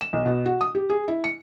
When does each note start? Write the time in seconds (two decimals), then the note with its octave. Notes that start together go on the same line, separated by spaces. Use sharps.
0.01 E7
0.13 B1
0.26 B2
0.46 F#4
0.61 D#6
0.75 G4
0.90 G#4
1.08 E4
1.24 C#7